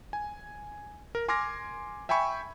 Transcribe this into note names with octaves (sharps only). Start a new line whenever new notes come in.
G#5
A#4
G#5 C6 D6 F6 G#6 A#6
E5 G5 G#5 B5 C#6